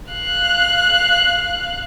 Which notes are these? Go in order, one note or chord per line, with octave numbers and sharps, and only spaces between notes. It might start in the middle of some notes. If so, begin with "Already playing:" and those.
F5 F#6